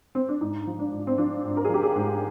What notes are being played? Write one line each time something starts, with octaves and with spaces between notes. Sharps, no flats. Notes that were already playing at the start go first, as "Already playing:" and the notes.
C4
D4
G#2 D#4
F3
D4
G#2
C4
F3 D4
G#2
A#4
G#4
F3 G4
G#4
G#2